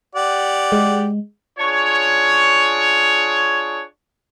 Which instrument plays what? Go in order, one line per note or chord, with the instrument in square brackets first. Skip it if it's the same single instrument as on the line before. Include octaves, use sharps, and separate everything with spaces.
[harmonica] G4 D5 F#5
[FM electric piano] G#3
[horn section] D4 F4 G#4 C#5